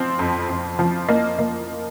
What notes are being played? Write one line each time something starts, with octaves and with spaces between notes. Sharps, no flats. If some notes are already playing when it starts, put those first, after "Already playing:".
Already playing: F3 C4
F2
F2
F3
A#3 D#5
A#3